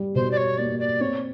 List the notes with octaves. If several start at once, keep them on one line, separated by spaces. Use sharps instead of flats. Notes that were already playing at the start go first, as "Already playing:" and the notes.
Already playing: G3
B2 C5
D5
C#5
A#3 D5
D5
C4 C#5